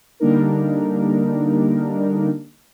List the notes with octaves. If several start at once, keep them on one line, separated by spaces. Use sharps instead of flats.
D3 G3 A#3 D4 D#4 A#4